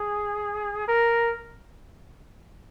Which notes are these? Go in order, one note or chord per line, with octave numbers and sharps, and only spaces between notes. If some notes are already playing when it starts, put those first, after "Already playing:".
Already playing: G#4
A#4